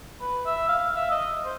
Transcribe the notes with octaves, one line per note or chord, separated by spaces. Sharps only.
B4
E5
F5
E5
D#5
C5